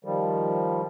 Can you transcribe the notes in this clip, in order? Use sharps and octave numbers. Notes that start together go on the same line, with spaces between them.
D#3 F3 G3